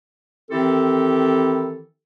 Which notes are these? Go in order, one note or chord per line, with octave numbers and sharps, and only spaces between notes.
D#3 E3 C4 E4 G4 A4